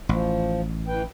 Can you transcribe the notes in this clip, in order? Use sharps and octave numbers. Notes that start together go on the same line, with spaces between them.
A1 F3
E3 B4 G5